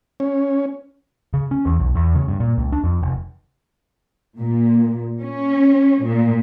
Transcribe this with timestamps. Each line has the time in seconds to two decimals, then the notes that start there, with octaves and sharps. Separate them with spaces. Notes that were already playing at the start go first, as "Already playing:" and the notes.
0.20 C#4
1.34 C#3
1.51 C#4
1.66 E2
1.80 B1
1.95 E2
2.15 C#3
2.28 G2
2.40 A#2
2.58 C#2
2.72 D4
2.84 F2
3.02 F1
4.39 A#2
5.22 C#4
6.04 A#2